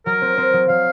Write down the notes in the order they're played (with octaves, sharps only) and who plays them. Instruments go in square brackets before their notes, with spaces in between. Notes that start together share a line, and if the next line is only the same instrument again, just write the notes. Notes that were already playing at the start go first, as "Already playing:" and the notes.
[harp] F#3 [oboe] A#4
[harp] C4
C4
F#3
[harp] F#3 [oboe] F5